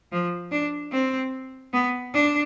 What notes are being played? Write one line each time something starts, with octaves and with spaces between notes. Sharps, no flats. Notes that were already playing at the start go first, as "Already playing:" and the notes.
F3
D4
C4
B3
D4